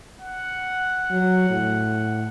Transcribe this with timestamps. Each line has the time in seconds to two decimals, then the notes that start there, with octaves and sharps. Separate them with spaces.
0.20 F#5
1.11 F#3
1.50 A2